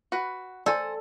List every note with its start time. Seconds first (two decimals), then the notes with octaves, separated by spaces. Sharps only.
0.12 F#4 B4
0.66 A4 C5 D5 G#5 C6